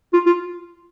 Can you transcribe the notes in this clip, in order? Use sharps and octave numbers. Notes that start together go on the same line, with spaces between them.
F4
F4